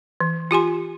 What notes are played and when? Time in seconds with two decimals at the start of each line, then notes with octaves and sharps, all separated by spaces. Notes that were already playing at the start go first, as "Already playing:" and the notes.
0.20 E3
0.51 F4 G4 G#5 C6